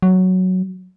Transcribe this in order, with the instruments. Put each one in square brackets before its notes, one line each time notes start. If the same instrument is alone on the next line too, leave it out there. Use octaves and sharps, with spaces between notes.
[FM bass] F#3